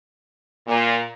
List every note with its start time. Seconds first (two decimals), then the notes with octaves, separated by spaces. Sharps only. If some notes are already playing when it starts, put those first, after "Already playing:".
0.67 A#2